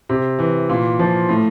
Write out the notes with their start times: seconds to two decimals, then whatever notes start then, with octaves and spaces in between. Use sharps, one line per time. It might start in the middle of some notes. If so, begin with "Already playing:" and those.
0.09 C3
0.39 E3
0.69 A#2
0.99 F3
1.29 A2